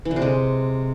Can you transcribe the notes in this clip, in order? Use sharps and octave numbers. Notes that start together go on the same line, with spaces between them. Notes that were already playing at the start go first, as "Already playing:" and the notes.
E3
D3
C3
G#3